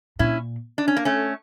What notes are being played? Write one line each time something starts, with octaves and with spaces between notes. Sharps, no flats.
A#2 C#4 E4
D4
C#4
A#3
A3 C#4